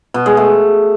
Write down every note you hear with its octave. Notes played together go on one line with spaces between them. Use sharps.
B2
G#3
A3